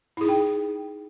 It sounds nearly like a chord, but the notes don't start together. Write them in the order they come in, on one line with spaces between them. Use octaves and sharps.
E4 G#4 D#4 G5